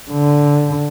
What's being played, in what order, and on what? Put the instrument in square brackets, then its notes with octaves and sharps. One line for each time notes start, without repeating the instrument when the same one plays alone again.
[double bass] D3